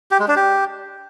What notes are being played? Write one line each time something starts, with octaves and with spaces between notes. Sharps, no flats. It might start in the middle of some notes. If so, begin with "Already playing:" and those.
G4
G#3
D4
G4